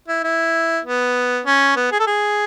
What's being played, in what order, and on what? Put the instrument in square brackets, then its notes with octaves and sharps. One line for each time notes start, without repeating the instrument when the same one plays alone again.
[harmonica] E4
E4
B3
C#4
B3
G#4
A4
G#4